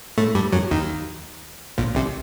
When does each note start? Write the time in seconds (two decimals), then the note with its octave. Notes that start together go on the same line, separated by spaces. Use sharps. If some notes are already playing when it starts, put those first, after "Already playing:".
0.18 A2 A3
0.35 G2 G3
0.52 F#2 F#3
0.71 D#2 D#3
1.78 A#1 A#2
1.95 C2 C3